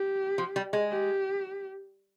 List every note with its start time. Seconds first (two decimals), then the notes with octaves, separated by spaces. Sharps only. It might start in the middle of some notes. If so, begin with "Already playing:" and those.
Already playing: G4
0.38 F3
0.56 G3
0.73 G#3
0.91 G4